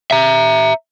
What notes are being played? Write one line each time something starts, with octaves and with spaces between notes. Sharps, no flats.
E5 A#5